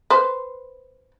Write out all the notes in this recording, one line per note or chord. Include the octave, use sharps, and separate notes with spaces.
B4 C5